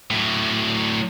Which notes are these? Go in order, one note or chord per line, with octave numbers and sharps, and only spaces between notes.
A2 F#3